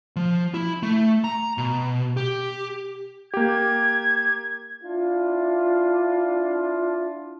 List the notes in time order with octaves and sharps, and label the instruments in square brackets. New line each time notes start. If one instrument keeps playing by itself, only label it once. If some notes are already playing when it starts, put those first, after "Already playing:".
[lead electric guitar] F3
E4
A3
A#5
B2
G4
[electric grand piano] A#3 G4 [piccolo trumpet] G#6
[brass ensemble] D4 E4 F4